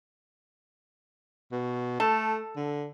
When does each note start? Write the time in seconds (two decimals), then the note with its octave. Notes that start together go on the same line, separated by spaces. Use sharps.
1.52 B2
2.00 A3 A4
2.56 D3